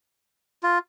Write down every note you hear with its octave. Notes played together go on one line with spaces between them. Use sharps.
F4